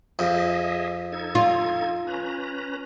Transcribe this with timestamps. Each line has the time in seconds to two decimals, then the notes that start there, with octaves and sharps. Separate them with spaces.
0.19 F2 G#4 D#5 E5
1.12 D#4 A4 G#6
1.35 F4
2.07 C#4 B4 A#5